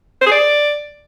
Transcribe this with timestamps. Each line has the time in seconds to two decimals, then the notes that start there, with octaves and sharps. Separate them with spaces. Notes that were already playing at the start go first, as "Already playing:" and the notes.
0.21 C5
0.26 G#4
0.31 D5